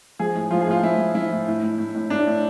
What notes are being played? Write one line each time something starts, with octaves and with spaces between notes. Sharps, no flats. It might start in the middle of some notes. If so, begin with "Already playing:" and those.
F3 G#4
A2
F3 F4
G#4
A2 F4
F3 E4
F3
F3 E4
A2
A2
A2
A2
A2
A2 D4
A2